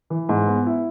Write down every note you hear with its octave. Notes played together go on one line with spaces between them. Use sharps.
E3
G#2
B3
E4